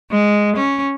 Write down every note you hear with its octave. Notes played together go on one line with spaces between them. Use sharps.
G#3
C#4